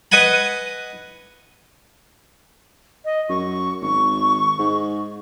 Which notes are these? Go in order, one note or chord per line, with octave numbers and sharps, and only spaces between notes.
B4 D#5 F#5 G#5 B5
D#5
F#2 C#6
G#1 C#6
G#2